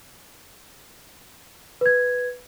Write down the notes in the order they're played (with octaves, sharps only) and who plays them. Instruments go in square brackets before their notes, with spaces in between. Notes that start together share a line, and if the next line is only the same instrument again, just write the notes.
[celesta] B4 G#6